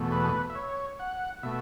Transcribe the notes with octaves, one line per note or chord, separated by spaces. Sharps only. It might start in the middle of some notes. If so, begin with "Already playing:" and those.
Already playing: E2 B2 A3
B4
E5
C#5
F#5
B2 A3 E5